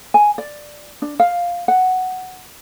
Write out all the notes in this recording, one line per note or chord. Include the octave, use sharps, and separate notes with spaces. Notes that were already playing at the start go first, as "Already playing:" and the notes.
G#5
D5
D4
F5
F#5